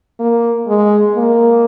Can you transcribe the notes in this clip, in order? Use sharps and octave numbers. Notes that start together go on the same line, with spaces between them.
A#3
G#3
A#3